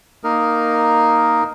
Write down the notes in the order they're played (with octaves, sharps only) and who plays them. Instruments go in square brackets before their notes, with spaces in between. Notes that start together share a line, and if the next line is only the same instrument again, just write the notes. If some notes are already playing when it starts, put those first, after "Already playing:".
[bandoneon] A#3 D#4 A#4